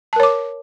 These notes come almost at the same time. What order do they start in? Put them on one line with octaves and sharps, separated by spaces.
A5 A#4 C#5 D6